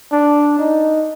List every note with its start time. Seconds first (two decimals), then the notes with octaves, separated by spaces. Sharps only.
0.12 D4
0.59 D#4